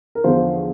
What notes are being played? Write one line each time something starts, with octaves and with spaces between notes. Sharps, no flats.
A#4
E2 D3 F3 C5